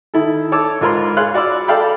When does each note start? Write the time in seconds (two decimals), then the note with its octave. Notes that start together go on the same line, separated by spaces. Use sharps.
0.14 D#3 E4 A4
0.52 A4 C#5 A5 D6 E6
0.81 G#2 F4 A#4 B5 C6
1.17 G#4 C#5 F5 C6 F#6
1.34 F#4 D5 B5 E6
1.68 A4 D5 F5 G5 B5